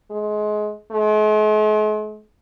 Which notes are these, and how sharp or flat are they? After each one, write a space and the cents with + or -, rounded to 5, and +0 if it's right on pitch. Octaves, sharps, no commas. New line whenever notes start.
G#3 +25
G#3 +45